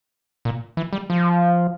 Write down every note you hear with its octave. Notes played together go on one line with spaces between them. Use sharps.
A#2
E3
G3
F3